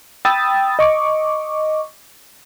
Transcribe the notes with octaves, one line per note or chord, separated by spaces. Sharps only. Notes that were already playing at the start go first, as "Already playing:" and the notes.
G5 B5 D#6 E6 A6
D#5 C#6 D6